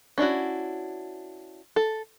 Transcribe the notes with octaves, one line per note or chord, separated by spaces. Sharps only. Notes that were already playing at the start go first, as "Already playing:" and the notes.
C#4 D4 E4 F#4
A4